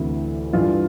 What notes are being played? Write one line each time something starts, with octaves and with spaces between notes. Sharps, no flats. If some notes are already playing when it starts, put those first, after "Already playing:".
Already playing: D2 C3 E3 E4
G2 E3 F4